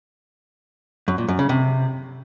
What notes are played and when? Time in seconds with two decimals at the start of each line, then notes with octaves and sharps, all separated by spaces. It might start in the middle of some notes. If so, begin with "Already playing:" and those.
1.08 F#2
1.18 A#2
1.28 F#2
1.39 C#3
1.49 C3